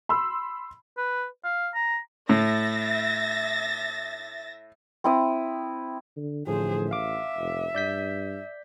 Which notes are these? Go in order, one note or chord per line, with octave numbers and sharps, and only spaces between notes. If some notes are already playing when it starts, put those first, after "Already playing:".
B5 C6 E6
B4
F5
A#5
A2 E5 A6 A#6
C4 E4 D#6
D3
A1 A2 D3 F3 G#4 C5
E5 F5 D6
F1
G2 D5 G6 B6